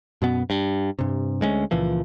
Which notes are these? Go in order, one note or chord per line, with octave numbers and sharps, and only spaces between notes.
F#2 B2 B3
G2
G2 C3
D2 G#3 A#3 C#4
C#2 A#2 E3 F3